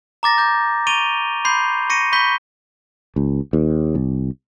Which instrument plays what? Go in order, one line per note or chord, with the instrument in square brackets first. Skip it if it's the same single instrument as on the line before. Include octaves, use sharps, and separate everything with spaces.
[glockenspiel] A#5 D6 A6 A#6
D6 G6
C#6 A6 D7 D#7 F7 G7
B5 C6 D6 G6 C7
C#6 A#6 C#7 D#7
B5 C#6 G6 B6 G7
[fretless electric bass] C#2
D#2
C2